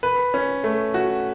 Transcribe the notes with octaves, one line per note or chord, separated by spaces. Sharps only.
B4
C#4
A3
F#4